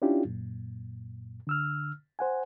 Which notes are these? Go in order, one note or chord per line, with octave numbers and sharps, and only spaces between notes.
C#4 D4 E4 F4 G4
F#2 A#2
D3 E6 F6
C5 F#5 G#5